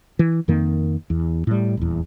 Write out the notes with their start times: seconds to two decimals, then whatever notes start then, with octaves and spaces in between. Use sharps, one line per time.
0.19 E3
0.48 F2 D#3 A#3
1.10 E2
1.47 A2 G3
1.77 D#1 E2